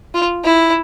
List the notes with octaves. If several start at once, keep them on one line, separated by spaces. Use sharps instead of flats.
F4
E4